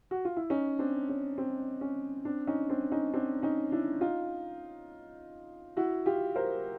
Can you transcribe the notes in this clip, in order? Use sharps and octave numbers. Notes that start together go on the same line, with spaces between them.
F#4
F4
E4
C#4 D#4
C4 D4
C#4
C4
C#4
C4 D4
C#4 D#4
C4 D4
C#4 D#4
C4 D4
C#4 D#4
D4 E4
D#4 F4
E4 F#4
F4 G4
A#4 C5